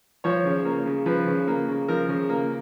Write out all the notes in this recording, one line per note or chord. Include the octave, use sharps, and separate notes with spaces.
F3 C#5
C#3
A#3
C#3
F3 B4
C#3
A#3
C#3
F3 A#4
C#3
A#3